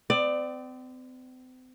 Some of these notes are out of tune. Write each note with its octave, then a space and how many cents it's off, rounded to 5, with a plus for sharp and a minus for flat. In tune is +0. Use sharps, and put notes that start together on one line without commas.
C4 -40 D5 +15